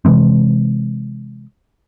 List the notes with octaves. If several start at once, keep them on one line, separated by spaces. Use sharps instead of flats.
C3 E3 G#3 C4